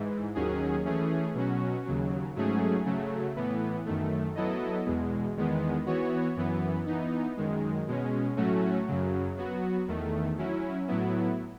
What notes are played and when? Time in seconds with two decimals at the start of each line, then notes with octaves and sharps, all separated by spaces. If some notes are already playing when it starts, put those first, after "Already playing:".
Already playing: G#2 E3
0.35 D#2 D#3 F#3 C#4 G#4
0.85 E3 A3 C#4 G#4
1.35 B2 F#3 C#4 F#4
1.85 D#2 C#3 F#3
2.36 G#2 F#3 A3 C#4 G#4
2.86 C#3 F#3 A3
3.36 A2 E3 B3
3.86 F#2 D#3 A3
4.35 F#3 B3 E4 A4 D#5
4.86 E2 B2 G#3
5.37 E2 D#3 G#3 B3
5.86 E3 B3 F#4 C#5
6.36 F#2 E3 B3
6.86 E3 B3 D#4
7.37 F#2 D#3 G#3
7.87 B2 G#3 C#4
8.37 A2 F#3 A3 C#4 F#4
8.87 F#2 C#3 F#3
9.37 F#3 B3 F#4
9.88 E2 D#3 A3
10.38 F#3 C#4 E4
10.88 A2 F#3 B3 E4